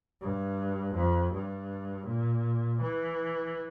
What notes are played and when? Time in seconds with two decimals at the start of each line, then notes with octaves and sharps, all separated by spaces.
0.21 G2
0.95 F2
1.33 G2
2.07 A#2
2.81 E3